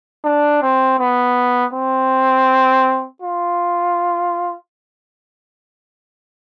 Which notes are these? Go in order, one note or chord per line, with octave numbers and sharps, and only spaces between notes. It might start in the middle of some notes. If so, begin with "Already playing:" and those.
D4
C4
B3
C4
F4